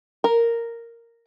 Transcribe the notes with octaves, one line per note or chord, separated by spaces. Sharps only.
A#4